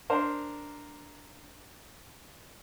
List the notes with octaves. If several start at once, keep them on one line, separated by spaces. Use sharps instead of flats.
D4 A#4 C5